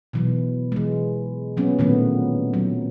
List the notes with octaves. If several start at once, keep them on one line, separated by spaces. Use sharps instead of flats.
B2 E3 F#3
E3 G#3
F3 F#3 A#3 B3 C#4
A#2 D#3 F#3 A3 B3 C4
F#3